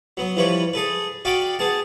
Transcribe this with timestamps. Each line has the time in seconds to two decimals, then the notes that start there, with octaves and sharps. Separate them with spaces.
0.17 F#3 B3
0.37 E3 F3 G3 B4 C#5
0.73 G#4 A4 B4
1.25 F#4 D5 F5 G5 B5 D#6
1.59 B3 G#4 A5